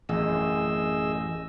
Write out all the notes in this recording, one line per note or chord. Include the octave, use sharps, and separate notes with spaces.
A1 F#2 G#4 D#5 E6